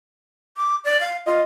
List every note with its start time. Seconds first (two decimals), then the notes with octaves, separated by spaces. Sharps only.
0.57 D6
0.84 D5
1.00 F5
1.26 F4 D#5